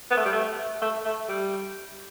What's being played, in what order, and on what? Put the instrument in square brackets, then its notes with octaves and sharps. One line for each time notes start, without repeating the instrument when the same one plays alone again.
[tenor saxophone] B3
A3
G3
A3
A3
A3
G3